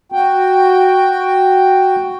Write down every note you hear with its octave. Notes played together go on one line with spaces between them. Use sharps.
F#4 G5